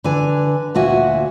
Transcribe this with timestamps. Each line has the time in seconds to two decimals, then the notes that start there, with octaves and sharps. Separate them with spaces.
0.04 D3 B4 G#5
0.75 D2 A#2 F#4 E5 G#5